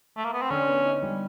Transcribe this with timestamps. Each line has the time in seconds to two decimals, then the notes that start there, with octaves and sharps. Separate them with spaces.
0.17 A3
0.25 A#3
0.33 B3
0.42 C4
0.50 D3 C#4
0.67 B3
0.84 D#4
1.02 G3